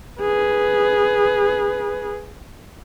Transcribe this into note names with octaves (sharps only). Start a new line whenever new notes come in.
G#4 B4